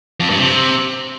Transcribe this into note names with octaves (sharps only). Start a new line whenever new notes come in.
F2
G2
C3